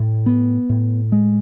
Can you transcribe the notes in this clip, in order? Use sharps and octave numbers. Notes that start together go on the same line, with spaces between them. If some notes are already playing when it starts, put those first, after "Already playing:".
Already playing: A2
B3
A2
G#3